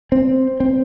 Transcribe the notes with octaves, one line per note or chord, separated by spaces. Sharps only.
C4
C4